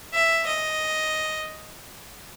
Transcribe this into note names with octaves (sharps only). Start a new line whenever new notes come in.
E5
D#5